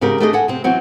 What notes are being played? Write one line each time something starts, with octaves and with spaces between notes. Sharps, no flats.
G#2 C#3 C4 G4 A#4
A3 D4 G4 G#4 C5 D#5
A4 F#5 G#5
C3 C4
E3 F#3 C4 F#4